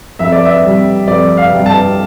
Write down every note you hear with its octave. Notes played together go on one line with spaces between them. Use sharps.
F2 E5
D5
E5
C3 G3
F2 D5
F5
C3 G3
A5